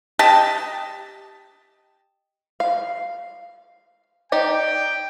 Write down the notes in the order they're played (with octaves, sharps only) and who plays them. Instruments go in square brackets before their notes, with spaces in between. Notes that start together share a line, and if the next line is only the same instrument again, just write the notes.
[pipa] G4 D#5 A5
[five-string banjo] F5
[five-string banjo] D#4 G4 D5 [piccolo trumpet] G5